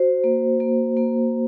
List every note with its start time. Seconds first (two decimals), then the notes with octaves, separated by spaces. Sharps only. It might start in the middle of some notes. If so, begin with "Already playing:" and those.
Already playing: F#4 C5
0.24 A#3
0.60 A#3
0.97 A#3